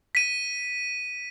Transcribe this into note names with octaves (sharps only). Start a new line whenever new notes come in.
B6 D#7